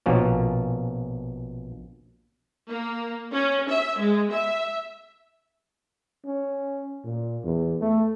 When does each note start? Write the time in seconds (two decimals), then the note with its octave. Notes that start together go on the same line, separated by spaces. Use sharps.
0.06 A#1 B2 F3 A#3 C#4
2.68 A#3
3.31 C#4
3.69 E5
3.98 G#3
4.32 E5
6.25 C#4
7.04 A#2
7.44 E2
7.81 A3